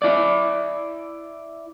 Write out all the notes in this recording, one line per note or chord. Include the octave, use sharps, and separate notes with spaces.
E4 D5